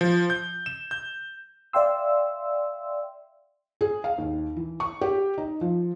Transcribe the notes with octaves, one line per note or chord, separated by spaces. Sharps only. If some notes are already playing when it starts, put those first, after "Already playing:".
F3
G6
E7
G6
D5 E5 F5 G5 C6 E6
G#4
F5
D#2
E3
C#6
G4
D#4
F3